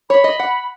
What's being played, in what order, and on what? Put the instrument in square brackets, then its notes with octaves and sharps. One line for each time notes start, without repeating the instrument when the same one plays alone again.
[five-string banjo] C#5 [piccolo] B5
[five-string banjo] D#5
F#5